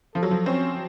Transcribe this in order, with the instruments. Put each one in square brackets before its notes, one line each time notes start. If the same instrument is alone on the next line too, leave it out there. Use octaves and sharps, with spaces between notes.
[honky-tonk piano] F3 [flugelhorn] A4
[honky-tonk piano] F#3
F3
[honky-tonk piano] C4 [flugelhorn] C#4